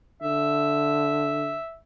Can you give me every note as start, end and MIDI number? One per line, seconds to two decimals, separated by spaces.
0.22 1.57 50
0.22 1.77 76